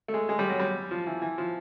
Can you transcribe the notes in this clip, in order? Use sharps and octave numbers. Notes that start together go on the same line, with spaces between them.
A3
G#3
G#3
G3
F#3
G3
F3
E3
E3
F3